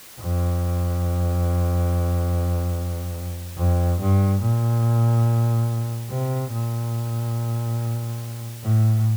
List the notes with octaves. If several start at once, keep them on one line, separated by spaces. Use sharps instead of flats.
F2
F2
G2
A#2
C3
A#2
A2